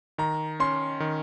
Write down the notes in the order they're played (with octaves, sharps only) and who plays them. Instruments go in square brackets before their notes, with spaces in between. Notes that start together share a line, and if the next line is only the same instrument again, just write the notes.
[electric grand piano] D#3 [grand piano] A#5
[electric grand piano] C#4 [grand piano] C6
[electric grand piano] D#3